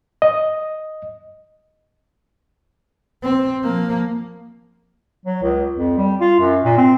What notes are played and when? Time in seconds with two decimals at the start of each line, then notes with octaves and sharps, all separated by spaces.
0.22 D#5
3.23 C4
3.63 F3 A#3
5.26 F#3
5.43 C#2
5.77 F2
5.98 G3
6.21 F4
6.39 F#2
6.64 A#2
6.78 C4